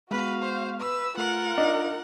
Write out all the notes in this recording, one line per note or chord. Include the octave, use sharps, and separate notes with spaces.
G#3 B3 F#4 B4 F5
C5
B4 E6
A3 F4 A#4 F#5
D4 D#4 D#5